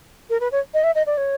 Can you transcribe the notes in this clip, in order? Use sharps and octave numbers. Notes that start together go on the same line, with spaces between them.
A#4
B4
C#5
D#5
E5
D#5
D5
C#5